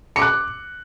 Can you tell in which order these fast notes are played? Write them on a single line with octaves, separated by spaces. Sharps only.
C#7 D6 F#6